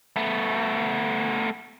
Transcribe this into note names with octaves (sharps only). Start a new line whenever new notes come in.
A3 B3